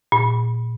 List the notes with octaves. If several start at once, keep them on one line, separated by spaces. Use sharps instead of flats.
A#2